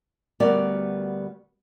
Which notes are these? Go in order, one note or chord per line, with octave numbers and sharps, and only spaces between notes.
D2 G3 B3 F#4 A#4 D5